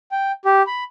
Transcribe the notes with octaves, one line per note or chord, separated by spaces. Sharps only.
G5
G4
B5